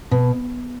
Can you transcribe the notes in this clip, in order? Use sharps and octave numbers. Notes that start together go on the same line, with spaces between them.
B2